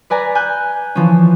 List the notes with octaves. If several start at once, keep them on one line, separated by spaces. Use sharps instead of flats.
B4 D5 G#5 A#5
G#5 F#6 G6
E3 F3 C#4